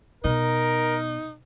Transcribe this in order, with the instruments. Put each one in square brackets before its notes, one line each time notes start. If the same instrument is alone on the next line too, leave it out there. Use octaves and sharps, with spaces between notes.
[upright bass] B2 [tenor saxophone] D#4 [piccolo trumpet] A#4